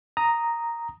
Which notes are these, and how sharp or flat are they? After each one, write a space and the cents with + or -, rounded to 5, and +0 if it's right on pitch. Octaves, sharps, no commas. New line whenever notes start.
A#5 +0 D#6 +0